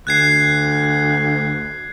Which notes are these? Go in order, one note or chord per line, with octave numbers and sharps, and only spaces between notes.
D2 F#6 G#6 C7